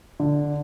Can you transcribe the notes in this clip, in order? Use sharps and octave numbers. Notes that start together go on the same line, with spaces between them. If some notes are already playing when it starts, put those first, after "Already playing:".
D3